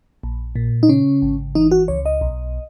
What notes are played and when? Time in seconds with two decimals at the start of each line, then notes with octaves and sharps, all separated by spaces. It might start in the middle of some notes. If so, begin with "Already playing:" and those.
0.23 A#1
0.56 A#2
0.83 D#4
0.89 C#3 C#4
1.22 G#1
1.55 E3 D#4
1.71 F#4
1.88 C#2 C#5
2.06 D#5
2.21 B1